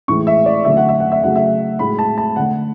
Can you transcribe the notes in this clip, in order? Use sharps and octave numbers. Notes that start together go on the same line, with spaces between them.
A2 E3 G#3 C#6
E5
D5
D3 F#3 A3 E5
F#5
E5
F#5
E5
C#3 F#3 A3 F#5
E5
A2 G#3 B5
A5
A5
D3 A3 F#5